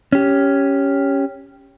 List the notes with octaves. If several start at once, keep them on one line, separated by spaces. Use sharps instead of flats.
C#4 G4